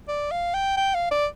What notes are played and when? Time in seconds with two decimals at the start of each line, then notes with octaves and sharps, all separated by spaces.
0.09 D5
0.32 F5
0.54 G5
0.77 G5
0.94 F5
1.11 D5